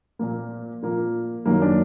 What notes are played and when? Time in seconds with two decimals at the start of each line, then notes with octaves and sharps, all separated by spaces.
0.19 A#2 F3 A#3
0.82 A#2 F3 A#3
1.45 F#2 D#3 F#3 A#3
1.62 D4